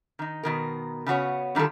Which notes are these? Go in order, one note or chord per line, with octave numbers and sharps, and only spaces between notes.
D#3 D#4
B2 D#3 A#4
C#3 B3 F#4 C#5
D3 D#3 G3 F4 A4